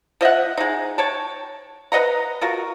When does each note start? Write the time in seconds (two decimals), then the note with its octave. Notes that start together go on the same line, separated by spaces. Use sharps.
0.21 F3 D#5 E5 F#5
0.57 G#3 D#4
0.98 C#5 G5 A5
1.92 B4 D#5 F#5 A#5
2.41 F4 F#4 A#4